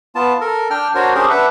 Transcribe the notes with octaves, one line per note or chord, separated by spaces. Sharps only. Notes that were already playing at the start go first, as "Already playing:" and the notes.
B3 F4 A5
A4 A#4
D4 G5 F6
D4 F#4 A#4 C5 C#5
C#4 D4 G4 G#4 A#4 C5
D4 B4 E5 F#5